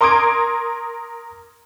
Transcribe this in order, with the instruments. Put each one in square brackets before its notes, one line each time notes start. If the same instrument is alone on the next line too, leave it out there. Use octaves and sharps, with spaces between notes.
[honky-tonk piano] A#4 C6 D6 D#6 G#6 D7